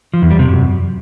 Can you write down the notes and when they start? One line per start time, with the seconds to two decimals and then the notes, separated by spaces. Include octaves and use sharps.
0.14 F3
0.22 E2
0.31 G3
0.39 C3
0.48 F#2